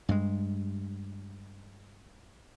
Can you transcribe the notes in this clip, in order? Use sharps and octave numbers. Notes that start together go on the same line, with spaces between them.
G2 G#3